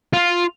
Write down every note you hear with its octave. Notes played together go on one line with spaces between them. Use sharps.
F4